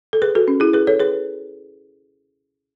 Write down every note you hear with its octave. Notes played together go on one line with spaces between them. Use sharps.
A4
G#4 B4
F#4 A4
C#4
E4 G#4
G#4 B4
A4 C#5
G#4 B4